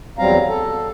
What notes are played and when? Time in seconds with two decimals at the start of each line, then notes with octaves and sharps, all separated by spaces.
0.19 E2 F#3 G3 C4 F5 A#5
0.48 A4